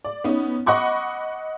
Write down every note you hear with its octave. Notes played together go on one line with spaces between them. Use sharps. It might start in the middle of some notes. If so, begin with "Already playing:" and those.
D5
B3 C#4 D#4
D#5 F#5 B5 C#6 D6